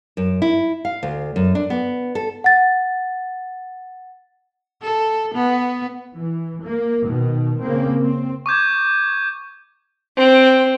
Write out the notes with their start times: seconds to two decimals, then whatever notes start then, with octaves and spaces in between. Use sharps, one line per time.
0.17 F#2
0.42 E4
0.85 F5
1.03 D2
1.36 F#2
1.55 D4
1.70 B3
2.15 A4
2.44 F#5 A6
4.82 A4
5.35 B3
6.15 E3
6.64 A#3
7.06 B2 D#3
7.61 C#3 A#3 C4
8.03 C4
8.46 C#6 D6 G6 G#6
10.16 C4